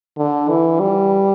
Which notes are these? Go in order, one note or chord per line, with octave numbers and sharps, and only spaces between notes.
D3
E3
G3